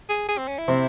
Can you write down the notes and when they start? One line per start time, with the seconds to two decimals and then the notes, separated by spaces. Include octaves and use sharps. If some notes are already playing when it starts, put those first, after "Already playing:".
0.09 G#4
0.28 G#4
0.38 C4
0.48 C#4
0.58 E4
0.68 C3 C4